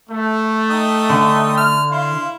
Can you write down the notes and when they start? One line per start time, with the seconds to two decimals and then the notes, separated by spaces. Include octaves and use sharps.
0.10 A3
0.70 D#4 G5 D#6
1.10 D3
1.57 F6
1.91 E4 F5 C6